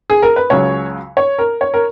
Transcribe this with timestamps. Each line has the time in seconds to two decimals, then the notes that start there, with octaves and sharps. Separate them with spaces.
0.10 G#4
0.22 A#4
0.36 B4
0.50 C#2 C#3 F#3 C#5
1.17 C#5
1.38 A#4
1.61 C#5
1.74 A#4